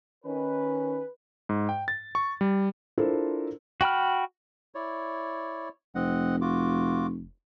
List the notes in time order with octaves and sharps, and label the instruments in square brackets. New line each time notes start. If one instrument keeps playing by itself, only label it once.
[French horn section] D#3 C#4 [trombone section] B4
[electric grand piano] G#2
G5
A6
C#6
G3
[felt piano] D4 E4 F4 A4 A#4 C5
[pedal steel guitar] F#4 G5 B5 F6
[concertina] E4 C#5 D5
[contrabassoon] F1 [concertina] C4 D#5 F#5
[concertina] F4 F#4 D6